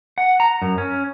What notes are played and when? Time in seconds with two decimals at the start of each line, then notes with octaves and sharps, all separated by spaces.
0.18 F#5
0.40 A#5
0.62 F#2
0.78 C#4